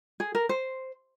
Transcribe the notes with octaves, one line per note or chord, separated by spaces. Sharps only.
G#4
A#4
C5